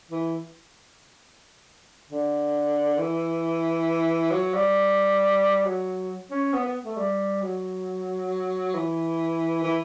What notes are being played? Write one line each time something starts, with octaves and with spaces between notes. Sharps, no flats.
E3
D3
E3
F#3
G3
F#3
C#4
B3
B3
A3
G3
F#3
E3
E3